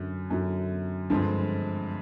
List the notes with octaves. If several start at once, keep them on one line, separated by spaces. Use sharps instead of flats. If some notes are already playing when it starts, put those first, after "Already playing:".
Already playing: F#2 D3 F#3
F#2 D3 F#3
G2 D3 F3 G#3 C4